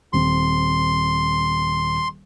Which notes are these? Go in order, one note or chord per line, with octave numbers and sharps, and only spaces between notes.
D#1 C4 C6